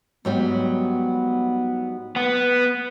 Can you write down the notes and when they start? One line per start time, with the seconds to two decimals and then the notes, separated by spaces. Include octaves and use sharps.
0.25 G#2 F#3 G3 B3
2.16 B3